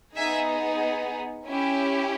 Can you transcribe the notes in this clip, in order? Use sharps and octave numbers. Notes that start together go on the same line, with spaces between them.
B3 D#4 G#4 E5 G#5
C#4 E4 G4